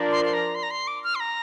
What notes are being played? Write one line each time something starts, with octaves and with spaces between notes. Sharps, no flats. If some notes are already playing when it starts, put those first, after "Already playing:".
Already playing: F3 D4 A#4 D5
C6
C6
A#5
C6
A#5
C6
D6
F6
C6
A#5